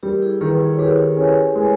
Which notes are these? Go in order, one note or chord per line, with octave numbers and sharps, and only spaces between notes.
G3 G4 A#4
E4 G#4
D#3 G#4 B4
E4 G#4
C#5
G4 G#4 B4
C#4
G#3